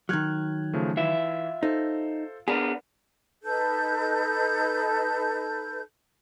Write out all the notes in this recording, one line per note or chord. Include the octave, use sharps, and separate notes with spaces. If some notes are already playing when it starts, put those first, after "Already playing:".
D#3 F#3 F6 F#6 G#6
C#3 F3 A3
E3 F4 E5
D#4 A4 C5
B3 D4 G#4 A#4
D#4 A4 B4 G6